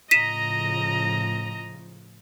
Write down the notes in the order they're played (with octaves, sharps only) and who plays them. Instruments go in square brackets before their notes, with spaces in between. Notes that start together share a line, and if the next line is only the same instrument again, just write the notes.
[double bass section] A2 C#3 F3 [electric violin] D#5 A#5 [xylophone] B6 D#7 E7